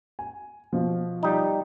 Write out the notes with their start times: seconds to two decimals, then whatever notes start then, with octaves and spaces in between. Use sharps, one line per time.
0.19 G#5
0.73 B2 F3
1.23 G3 D#4